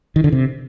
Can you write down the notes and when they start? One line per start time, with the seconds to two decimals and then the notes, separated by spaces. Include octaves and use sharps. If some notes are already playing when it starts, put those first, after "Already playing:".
0.16 D#3
0.24 D3
0.32 C3